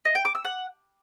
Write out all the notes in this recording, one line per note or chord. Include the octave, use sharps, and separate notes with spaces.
D#5
G5
D6
E6
F#5